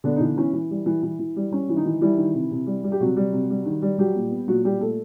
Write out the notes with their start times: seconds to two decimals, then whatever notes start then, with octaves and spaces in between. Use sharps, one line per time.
0.04 D3 B3 D4
0.16 D#4
0.20 D3 E3 D4
0.37 E3 C#4
0.53 E3
0.71 G3
0.86 E3
1.03 E3
1.19 E3
1.36 G3
1.52 G3 C#4
1.69 E3
1.76 D#3 D#4
1.86 E3
2.01 E3 G3 E4
2.18 D#3
2.34 C3
2.51 C3
2.67 G3
2.84 G3
2.92 G4
3.00 C3 F#3 F#4
3.16 G3
3.33 C3
3.50 G3
3.66 D#3
3.82 G3
3.98 F#3 G3 G4
4.15 A#2
4.31 B3
4.48 A#2 F#3 F#4
4.64 A#2 G3 G4
4.80 A#2 A3 A4